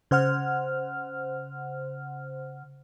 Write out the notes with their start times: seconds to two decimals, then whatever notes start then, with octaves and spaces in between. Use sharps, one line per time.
0.11 C#3 C5 F#5 F6